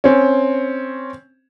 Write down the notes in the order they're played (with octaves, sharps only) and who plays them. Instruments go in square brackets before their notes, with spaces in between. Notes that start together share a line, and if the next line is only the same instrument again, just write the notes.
[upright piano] C4 C#4